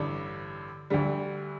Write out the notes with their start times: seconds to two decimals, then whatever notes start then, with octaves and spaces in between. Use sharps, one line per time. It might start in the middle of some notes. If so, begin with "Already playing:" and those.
Already playing: A1 G2 D3
0.90 D2 D3 G3